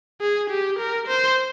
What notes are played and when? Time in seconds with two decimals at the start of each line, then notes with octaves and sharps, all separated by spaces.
0.21 G#4
0.50 G4
0.79 A#4
1.08 C5